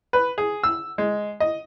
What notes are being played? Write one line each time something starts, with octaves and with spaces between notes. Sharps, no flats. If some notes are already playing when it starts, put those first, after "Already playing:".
B4
G#4
E6
G#3
D#5